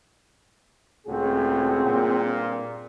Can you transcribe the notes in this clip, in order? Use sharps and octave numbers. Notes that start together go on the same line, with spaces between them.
C#2 A2 C4 F#4 G#4
G2 A#2